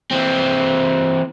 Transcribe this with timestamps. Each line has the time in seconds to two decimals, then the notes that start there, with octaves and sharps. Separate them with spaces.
0.11 E3 C4